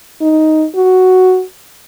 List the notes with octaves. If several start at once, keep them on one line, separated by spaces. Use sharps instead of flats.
D#4
F#4